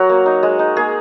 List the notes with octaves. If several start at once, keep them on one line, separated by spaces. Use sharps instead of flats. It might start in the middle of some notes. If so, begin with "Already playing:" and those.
Already playing: F#3 F#4 A#4
A#3
D#4
G#3
D#4
A#3 G#4